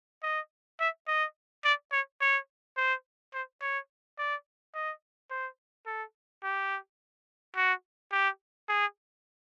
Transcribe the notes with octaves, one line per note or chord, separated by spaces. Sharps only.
D#5
E5
D#5
D5
C#5
C#5
C5
C5
C#5
D5
D#5
C5
A4
G4
F#4
G4
G#4